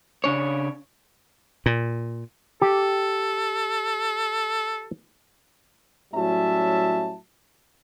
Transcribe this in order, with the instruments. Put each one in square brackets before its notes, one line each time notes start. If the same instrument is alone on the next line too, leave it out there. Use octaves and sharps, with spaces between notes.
[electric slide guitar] C#3 D4 C#5
[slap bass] A#2
[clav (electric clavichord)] G4 [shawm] A4
[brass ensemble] A2 F#3 G3 C#4 E5 A5